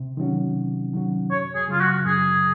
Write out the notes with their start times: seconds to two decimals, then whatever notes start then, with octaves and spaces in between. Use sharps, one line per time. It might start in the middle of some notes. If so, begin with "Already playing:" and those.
Already playing: C3
0.17 D#3 F#3 C#4 F#4
0.55 C3
0.93 D#3 F#3 C#4 F#4
1.31 F#2 C#5
1.55 G#4
1.68 C#3 F#3 F4
1.81 F#4
2.06 F#2 G#4